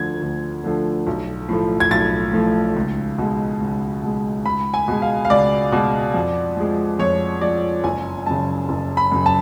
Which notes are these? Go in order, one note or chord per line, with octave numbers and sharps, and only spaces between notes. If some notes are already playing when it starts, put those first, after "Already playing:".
Already playing: D2 D3 F3 A3 G#6
D2
D3 F3 A3
B1
A2 F3 A3
G#6
B1 A6
A2 F3 A3
C#2
B2 G#3
C#2
B2 G#3
C#2 B5
G#5
B2 G#3
F5
F5
C#2 D5
B2 G#3
F2
F3 G#3
F2 C#5
F3 G#3 D5
F#1 G#5
F#2 C#3 A5
F#1
B5
F#2 C#3
A5